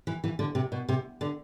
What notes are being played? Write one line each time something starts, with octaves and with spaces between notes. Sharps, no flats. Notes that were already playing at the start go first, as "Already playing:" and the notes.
E3
E3
D3
C3
B2
C3
D3